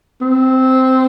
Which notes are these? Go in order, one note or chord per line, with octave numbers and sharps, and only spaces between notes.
C4